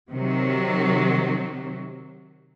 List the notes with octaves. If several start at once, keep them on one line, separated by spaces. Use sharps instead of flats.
C3 D#3 F#3